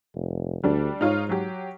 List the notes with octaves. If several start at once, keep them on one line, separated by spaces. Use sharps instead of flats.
F1
D2 G3 D4
G#2 D#4 F4 C#5
F#3 G4